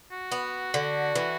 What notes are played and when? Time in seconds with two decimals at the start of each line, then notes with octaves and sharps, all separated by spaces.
0.12 F#4
0.32 B3
0.74 D3
1.15 E3